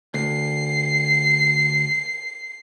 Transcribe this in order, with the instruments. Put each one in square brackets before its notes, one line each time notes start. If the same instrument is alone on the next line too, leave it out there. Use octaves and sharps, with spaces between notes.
[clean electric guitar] D2 [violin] C7